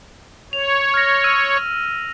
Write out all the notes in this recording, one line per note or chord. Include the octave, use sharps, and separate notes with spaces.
C#5 F7
F6 A#6
E6 F6 D#7